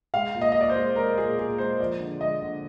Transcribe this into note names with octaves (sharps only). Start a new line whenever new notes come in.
G#3 F5
A#2
D#5
A#2 D#5
D5
C5
G#3
G#3 A#4
A#2 G#4
A#2 G#4
G#3 C5
F3 D5
D3
G#3 D#5
D3